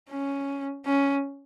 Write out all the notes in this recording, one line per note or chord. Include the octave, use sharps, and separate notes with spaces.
C#4
C#4